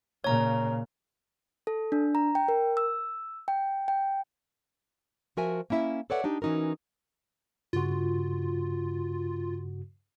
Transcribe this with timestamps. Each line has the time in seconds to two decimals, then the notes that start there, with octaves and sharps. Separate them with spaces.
0.24 A#2 C#3 C#5 A#5
1.67 A4
1.92 D4
2.15 A#5
2.35 G5
2.48 A#4
2.77 E6
3.48 G5
3.88 G5
5.37 F3 F#4 A#4 E5 G#5
5.70 A#3 C#4 E4 E5
6.10 A4 B4 C#5 D5 E5 F#5
6.24 D4 D#4 G4
6.42 E3 C#4 D#4 F#4 A#4
7.73 G2 C#3 F4 F#4